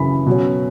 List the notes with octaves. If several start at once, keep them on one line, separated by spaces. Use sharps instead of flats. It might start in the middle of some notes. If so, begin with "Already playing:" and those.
Already playing: F#2 C#3 E3 B5
B2 F#3 C#4